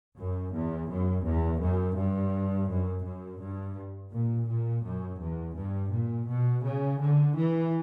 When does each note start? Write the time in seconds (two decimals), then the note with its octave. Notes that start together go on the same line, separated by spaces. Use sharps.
0.18 F#2
0.54 E2
0.89 F#2
1.25 E2
1.61 F#2
1.96 G2
2.69 F#2
3.04 F#2
3.41 G2
4.12 A#2
4.48 A#2
4.83 F#2
5.19 E2
5.55 G2
5.91 A#2
6.27 B2
6.63 C#3
6.99 D3
7.35 E3